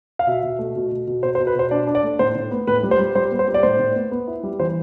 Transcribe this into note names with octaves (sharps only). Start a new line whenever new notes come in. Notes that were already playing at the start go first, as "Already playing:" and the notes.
F5
B2 E5
B2
A3
B2
B2
B2
B2 C5
C5
B2
B4
B2 C5
D4 D5
D4
D5
A3
A2 C5
A2
B3
A2 B4
G3
C5
G3
G3 C5
B3
C5
G3
D5
A2 C5
A2
B3
B3
E4
G3
E3 C5